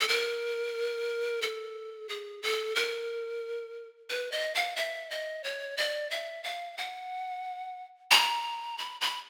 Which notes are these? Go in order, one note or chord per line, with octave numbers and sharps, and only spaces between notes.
A4
A#4
A4
G#4
A4
A#4
B4
D#5
F5
E5
D#5
C#5
D5
E5
F5
F#5
A#5
B5
B5